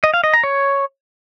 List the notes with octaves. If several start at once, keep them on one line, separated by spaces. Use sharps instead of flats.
D#5
F5
D#5
A#5
C#5